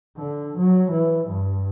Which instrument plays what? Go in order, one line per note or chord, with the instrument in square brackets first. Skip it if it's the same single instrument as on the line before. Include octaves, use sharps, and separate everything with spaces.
[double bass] D3
F#3
E3
G2